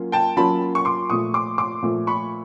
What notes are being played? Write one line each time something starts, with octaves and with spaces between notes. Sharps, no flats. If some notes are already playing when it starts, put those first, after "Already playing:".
Already playing: F#3 A#3 C#4 F4
G5 A5
F#3 A#3 C#4 F4 A5 B5
C#6
C6 D6
A#2 F3 A3 C#6 D#6
C6 D6
C6 D6
A#2 F3 A3
B5 C#6